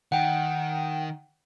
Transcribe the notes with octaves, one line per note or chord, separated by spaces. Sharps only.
D#3 F#5 G5